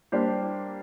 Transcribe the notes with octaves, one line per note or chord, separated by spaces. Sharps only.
G3 A#3 D4 G4 C5